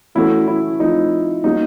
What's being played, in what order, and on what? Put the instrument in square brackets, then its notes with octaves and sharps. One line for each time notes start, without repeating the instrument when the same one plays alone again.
[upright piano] E3 A3 C#4 F#4 A4 [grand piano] E4
[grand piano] E4
[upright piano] F3 A3 C4 E4 [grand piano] D#4
[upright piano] G3 A#3 C#4 F#4 [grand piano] D#4